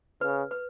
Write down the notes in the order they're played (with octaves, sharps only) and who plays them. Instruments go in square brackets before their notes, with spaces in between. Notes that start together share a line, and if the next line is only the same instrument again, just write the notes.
[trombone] C#3 [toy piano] B4
[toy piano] B4